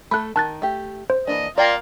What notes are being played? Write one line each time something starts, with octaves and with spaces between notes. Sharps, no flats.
A3 A4 B5 F#6
D#3 A5 F#6 A6
A3 G4
C5
E3 A#3 D4 D#5
A#3 F4 A#4 D5 G5